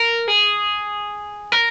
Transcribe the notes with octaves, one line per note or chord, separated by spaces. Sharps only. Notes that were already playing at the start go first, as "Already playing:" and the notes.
Already playing: A#4
G#4
A#4